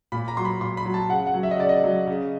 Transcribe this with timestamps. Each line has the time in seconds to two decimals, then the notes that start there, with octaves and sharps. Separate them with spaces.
0.12 A#2 B5
0.28 A#5
0.37 F#3 C6
0.45 B5
0.61 A#2 C6
0.77 B5
0.85 F#3
0.94 A5
1.09 C#3 F#5
1.27 F#5
1.34 F#3
1.43 E5
1.51 D#5
1.59 C#3 D5
1.69 D#5
1.83 F#3
2.07 C#3